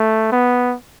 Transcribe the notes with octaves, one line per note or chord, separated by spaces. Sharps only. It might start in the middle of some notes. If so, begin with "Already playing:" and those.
Already playing: A3
B3